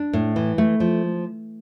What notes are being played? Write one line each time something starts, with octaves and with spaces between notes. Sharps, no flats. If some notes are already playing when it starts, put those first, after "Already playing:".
Already playing: D4
A2
E3
A3
F3